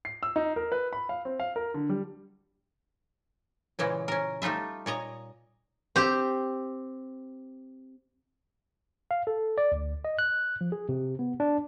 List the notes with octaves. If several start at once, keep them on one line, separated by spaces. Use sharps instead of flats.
C7
E6
D#4
A#4
B4
B5
F5
C4
F5
A#4
D3
G3
A#2 C#3 E3 G#3
C#4 A#4
G3 A3 D#4 F4 E5
A#2 C#5 D#5 A#5
C4 G4
F5
A4
D5
D2
D#5
F#6
F3
G#4
C3
B3
D4